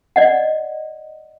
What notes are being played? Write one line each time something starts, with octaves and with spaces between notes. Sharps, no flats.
D5 D#5 F#5